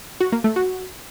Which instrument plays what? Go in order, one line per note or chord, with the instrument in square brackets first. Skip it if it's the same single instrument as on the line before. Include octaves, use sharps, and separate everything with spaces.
[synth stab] F#4
A#3
A3
F#4